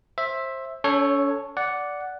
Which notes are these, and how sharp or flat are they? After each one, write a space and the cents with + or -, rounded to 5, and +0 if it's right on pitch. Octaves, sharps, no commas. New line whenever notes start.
C5 +25 E5 +0
C#4 +35 A4 +5 C#5 +0
D5 -10 F#5 +0